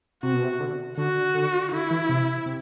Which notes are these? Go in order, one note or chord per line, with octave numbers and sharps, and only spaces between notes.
C3 F#4
B2
C3
D3
D3 F#4
D3
D3 E4
E3
C3
C3